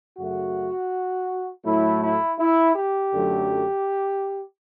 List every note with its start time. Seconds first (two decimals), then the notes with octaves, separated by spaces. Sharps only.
0.17 F#2 C#3 F#3 A3 F#4
1.64 A2 F#3 A3 E4
2.02 E4
2.38 E4
2.75 G4
3.12 F#2 D3 F#3 A3